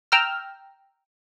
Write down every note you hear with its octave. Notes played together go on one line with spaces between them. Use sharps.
G5 A#5 E6 F6